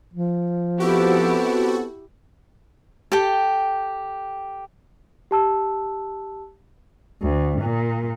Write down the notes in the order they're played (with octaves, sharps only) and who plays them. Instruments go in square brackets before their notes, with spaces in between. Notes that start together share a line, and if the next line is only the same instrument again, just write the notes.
[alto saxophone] F3
[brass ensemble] B3 C4 A4 [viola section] E4 G4 [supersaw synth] F#4
[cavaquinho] G4 A4 G5
[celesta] G4 A5 E6
[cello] D2
A#2